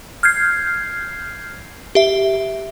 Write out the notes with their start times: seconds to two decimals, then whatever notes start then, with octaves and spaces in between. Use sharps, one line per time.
0.23 F6 G6 G#6 C7
1.95 G4 E5